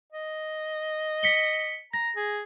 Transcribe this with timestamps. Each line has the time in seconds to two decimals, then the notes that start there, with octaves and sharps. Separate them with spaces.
0.12 D#5
1.23 B6 C#7 G7
1.93 A#5 A#6
2.16 G#4